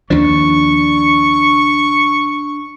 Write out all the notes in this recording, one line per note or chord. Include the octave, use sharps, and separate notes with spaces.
D#2 F3 D4 C#6